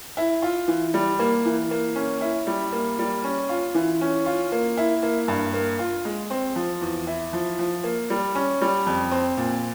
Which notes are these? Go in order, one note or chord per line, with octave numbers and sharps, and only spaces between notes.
E4
F4
E3
G3
A#3
E3
A#3
C#4
E4
G3
A#3
G3
C#4
F4
E3
C#4
F4
A#3
E4
A#3
G2
A#3
F4
G#3
C4
F3
E2
E4
F3
F3
A#3
G3
C#4
G3
F2
C4
A#2